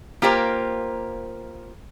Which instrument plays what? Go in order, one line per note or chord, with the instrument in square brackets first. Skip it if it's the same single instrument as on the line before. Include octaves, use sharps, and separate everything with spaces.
[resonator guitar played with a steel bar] A#3 F4 G4 A#4 C5